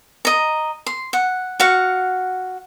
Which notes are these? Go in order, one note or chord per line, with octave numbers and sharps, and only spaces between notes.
D#5 A#5
C6
F#5
F#4 F5 F#5